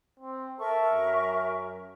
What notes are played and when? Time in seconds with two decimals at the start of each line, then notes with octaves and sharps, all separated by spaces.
0.20 C4
0.60 A4 A#4 E5 C#6
0.93 F#2